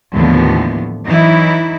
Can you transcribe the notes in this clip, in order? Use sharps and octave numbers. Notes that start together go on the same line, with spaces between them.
D#2 A2 D3 E3 F3 B3
E3 F#3 D#4 E4